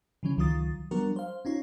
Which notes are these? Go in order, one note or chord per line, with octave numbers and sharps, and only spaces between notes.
C#3 E3 F#3 C#4
C#2 D#3 F#3 F4 D#6 A6
F#3 G3 B3 D4 F#4 A#4
C5 F5
C#4 D#4 F4 C#5